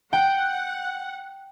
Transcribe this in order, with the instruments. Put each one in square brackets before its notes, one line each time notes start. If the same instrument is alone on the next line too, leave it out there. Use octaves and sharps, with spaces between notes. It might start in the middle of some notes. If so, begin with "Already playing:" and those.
[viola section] F#5 [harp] G5